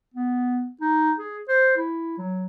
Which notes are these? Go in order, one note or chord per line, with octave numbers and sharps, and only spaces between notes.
B3
D#4
G#4
C5
E4
F#3